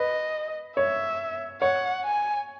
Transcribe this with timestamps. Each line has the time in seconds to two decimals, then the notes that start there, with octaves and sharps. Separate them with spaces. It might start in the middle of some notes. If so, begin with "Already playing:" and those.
Already playing: B4 D#5
0.77 C#5 E5
1.61 C#5 F#5
2.04 G#5